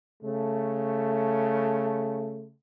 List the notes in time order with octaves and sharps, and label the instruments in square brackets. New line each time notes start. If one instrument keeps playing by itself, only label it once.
[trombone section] C#3 A3